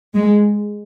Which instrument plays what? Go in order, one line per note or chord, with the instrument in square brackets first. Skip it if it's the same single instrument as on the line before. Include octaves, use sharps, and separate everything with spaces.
[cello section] G#3